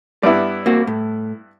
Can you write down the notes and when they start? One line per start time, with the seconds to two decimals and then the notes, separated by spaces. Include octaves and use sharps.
0.23 G2 B3 E4 D5
0.66 A#3 C4 F#4
0.87 A2